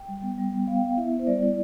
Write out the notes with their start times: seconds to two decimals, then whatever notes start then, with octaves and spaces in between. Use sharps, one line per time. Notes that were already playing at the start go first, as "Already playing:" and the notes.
Already playing: G5
0.08 G3
0.23 B3
0.38 G3
0.53 B3
0.67 B3 F5
0.76 G5
0.83 B3 F5
0.97 E4 E5
1.12 B3
1.19 C5
1.27 G3 D5
1.43 E4